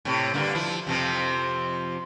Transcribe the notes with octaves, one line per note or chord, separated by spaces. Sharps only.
A2 C3
G2 D3 A#3
F3 E4
F2 C3 F3